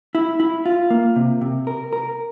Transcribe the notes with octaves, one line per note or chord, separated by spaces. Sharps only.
E4
E4
F4
A#3
C3
C3
A#4
A#4